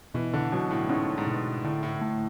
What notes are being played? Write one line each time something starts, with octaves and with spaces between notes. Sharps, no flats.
B2 E3
D3
B2 F#3
A2
G#2 C#4
G#2
B2
A2 D3
A2
A2 A3